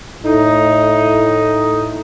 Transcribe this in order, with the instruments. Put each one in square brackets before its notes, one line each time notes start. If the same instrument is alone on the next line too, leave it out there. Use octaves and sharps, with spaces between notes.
[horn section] A2 D#4